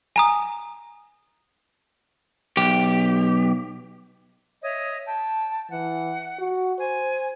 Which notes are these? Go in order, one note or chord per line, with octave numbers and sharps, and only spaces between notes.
G#5 A#5 D#6
B1 G4
C#5 D#5 E5
G5 A5
E3 F#5
F#4
C5 G#5